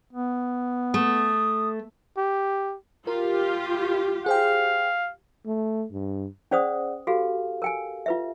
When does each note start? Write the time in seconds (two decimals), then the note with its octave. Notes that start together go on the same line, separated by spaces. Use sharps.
0.13 B3
0.94 A3 D#6
2.18 G4
3.07 F4 G4 A#4
4.26 G#4 C5 F5 G5
5.46 A3
5.92 G2
6.51 C#4 G#4 C5 D5 F#5 D#6
7.07 F#4 G4 A4 F5
7.62 A#4 G5 G#5
8.06 F4 B4 E5